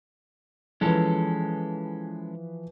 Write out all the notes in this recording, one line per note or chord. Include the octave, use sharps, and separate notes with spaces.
E3 F3 G#3 C#4 A4 B4